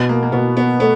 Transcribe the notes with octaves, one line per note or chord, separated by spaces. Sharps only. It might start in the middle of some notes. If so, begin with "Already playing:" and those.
Already playing: B2 B3
A#3
A#3
B2 B3
B3
A3 B3